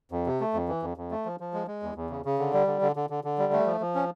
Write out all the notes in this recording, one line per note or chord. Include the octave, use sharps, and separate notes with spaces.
F2
C3
A3
F2
E3
F2
F2
A3
F3
F3
G#3
G#3
E2
E2
C#3
C#3
D3
G3
D3
D3
D3
D3
D3
G3
A3
F3
F3
C#4